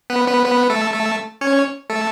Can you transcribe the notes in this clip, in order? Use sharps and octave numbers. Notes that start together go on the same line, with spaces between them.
B3 B4
B3 B4
B3 B4
A3 A4
A3 A4
C#4 C#5
A3 A4